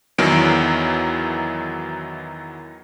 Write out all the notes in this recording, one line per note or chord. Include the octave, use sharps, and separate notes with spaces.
E2 D#3 E3 F#3 A#4 D7